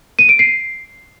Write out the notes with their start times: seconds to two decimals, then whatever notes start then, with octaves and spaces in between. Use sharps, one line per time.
0.19 D#7
0.29 D7
0.39 C7